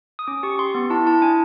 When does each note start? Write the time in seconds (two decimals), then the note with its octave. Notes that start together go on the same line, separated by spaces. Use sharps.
0.19 D#6
0.27 C#4 D6
0.43 G4 C#6
0.59 G4 C6
0.75 B3
0.90 E4 A5
1.07 E4 A5
1.22 D4 G#5